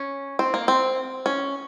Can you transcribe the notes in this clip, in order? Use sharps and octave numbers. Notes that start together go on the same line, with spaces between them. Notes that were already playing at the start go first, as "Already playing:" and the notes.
Already playing: C#4
C4
A#3
C4
C#4